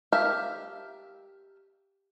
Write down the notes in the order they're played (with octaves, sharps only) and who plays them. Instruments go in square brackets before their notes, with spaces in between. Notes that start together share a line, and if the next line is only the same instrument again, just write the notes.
[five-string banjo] G4 A#4 E5 F5 A5